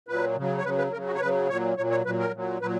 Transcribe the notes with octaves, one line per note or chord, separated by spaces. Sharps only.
A#2 F#3 B4
C#3 F#3
C#5
C#3 F#3 B4
B4
C#3 F#3 A#4
F#4
C#5
C#3 F#3 B4
A#2 F#3 C#5
A#2 F#3 C#5
C#5
A#2 F#3 B4
A#4
A#2 F#3
A#2 F#3 B4